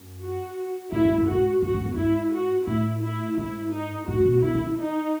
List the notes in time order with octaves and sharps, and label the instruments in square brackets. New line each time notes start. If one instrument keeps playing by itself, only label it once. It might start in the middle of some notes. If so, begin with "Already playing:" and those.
Already playing: [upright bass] F#2
[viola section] F#4
[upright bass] A2 [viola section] E4
[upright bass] G#2
F#2
[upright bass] G#2 [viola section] F#4
[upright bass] G#2 [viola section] F#4
[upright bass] G#2
E2
[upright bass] G#2 [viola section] E4
[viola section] F#4
[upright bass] A2 [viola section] E4
[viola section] E4
[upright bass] G#2 [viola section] E4
[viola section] D#4
[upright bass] A2 [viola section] F#4
[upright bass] A2
B2
[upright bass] B2 [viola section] E4
[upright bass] D#3
E3
[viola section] D#4